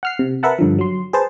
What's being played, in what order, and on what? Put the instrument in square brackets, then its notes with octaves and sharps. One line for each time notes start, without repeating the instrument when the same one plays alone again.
[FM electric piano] F#5 F6 C7
C3
A#4 B4 E5 F#5 A5
G2 D3 F3
F#3 C6
G#4 B4 C5 A5